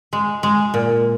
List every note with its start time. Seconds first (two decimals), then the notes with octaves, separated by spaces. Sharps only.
0.13 G#3
0.43 G#3
0.74 A#2